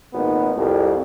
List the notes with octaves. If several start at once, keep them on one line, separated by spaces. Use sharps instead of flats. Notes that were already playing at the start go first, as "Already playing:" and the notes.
G#1 A#2 B3 D#4
C2 F2